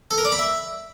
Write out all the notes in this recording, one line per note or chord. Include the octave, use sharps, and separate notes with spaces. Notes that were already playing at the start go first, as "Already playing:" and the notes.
A4
A#4
D5
B5
E5